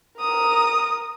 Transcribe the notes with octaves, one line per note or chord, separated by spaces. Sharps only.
A#4 D#6